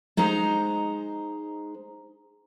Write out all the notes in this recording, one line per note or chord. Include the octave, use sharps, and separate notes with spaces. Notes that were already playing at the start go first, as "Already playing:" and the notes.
G#3 D#4 C5 A#5